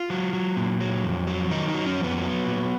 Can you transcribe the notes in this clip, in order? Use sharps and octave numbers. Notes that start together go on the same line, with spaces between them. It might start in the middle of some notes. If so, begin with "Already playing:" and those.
Already playing: F4
F#3
F#3
A#2
F#3
F2
F#3
D#3 D#4
D#4
F#3
C#4
F2
B3
F#3
A#2